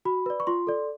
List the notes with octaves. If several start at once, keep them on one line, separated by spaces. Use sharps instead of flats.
F#4 B5
B4 D5
C#6
F4 C6
A4 D5